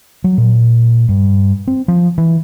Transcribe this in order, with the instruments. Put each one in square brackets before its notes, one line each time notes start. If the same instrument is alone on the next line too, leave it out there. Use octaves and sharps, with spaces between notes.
[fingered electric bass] F#3
A#2
G2
C4
F3
E3